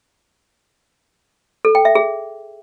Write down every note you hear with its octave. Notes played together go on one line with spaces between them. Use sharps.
A4
G5
E5
G#4